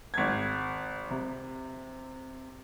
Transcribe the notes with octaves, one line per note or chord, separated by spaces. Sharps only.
G#1 G#6
C3